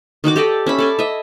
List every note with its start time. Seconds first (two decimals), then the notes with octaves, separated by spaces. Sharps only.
0.24 D#3 D#4 F#4 D6
0.36 G4 A4 D5 D#5
0.66 C#4 E5 B5
0.79 A4 D5 G#5
0.99 D#5 E5